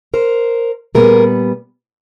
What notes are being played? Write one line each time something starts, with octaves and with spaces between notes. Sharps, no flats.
A#4 C5
A#2 G3 B3 G#4 A#4